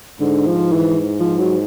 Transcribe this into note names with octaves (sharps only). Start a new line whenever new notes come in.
G#2 D3
F3
E3
F3
F#3